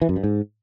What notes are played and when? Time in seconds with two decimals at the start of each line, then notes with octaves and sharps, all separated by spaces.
0.02 E3
0.09 F#2
0.16 G2
0.23 G#2